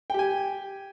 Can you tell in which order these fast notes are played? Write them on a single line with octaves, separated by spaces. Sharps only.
G5 G4 G#5